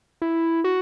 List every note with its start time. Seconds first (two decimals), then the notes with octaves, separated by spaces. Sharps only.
0.22 E4
0.64 F#4